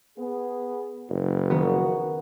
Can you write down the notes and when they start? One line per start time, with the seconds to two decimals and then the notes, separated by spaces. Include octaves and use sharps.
0.19 B3 G#4
1.09 F#1
1.50 D#3 F3 B3 F#4